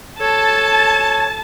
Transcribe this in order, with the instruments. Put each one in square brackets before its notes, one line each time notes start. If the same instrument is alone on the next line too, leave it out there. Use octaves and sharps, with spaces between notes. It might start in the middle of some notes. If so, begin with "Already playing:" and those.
[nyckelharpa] A4 [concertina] C#5 [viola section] A5